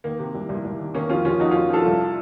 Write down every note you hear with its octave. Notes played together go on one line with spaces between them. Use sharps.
D#3 A#3
C3
C2
C2
C2
D#3
D#3 A#3 C#4
F2 C#4 F4
D#3 C#4 F4
F2 D#4 F#4
F2 C#4 F4
F2 F4 A4
C2